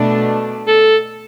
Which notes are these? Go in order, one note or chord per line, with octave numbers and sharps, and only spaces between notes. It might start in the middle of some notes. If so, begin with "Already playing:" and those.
Already playing: B2 A3 D4
A4